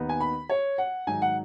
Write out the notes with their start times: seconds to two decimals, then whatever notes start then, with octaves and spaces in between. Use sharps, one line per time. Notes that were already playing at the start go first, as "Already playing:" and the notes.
Already playing: D#2 D#3 B3 D#4
0.09 G#5
0.20 B5
0.49 C#5
0.78 F#5
1.07 G#2 D#3 F#3 D#4 G#5
1.22 F#5